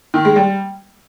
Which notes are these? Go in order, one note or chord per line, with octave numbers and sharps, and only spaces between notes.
D#3
G#3
G3